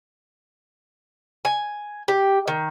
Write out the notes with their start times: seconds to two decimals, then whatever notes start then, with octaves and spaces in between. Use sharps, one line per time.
1.45 G#5
2.08 G4
2.48 D#3